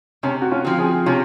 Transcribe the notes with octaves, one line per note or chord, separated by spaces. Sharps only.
C3 C#4
F#4
C#4 F4
F3 C4
F4 G#4
C3 C#4 F4